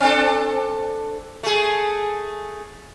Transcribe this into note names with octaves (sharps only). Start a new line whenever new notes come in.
C4 D4 A4
A3 G#4